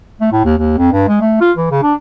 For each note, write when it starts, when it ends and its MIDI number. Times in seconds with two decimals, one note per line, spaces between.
0.21 0.31 57
0.32 0.41 45
0.45 0.54 39
0.58 0.76 39
0.78 0.90 41
0.92 1.06 43
1.08 1.18 56
1.21 1.40 57
1.41 1.52 65
1.57 1.69 52
1.71 1.80 49
1.83 1.94 62